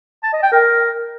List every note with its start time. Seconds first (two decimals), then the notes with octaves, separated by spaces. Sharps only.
0.23 A5
0.33 D#5
0.43 G5
0.52 A#4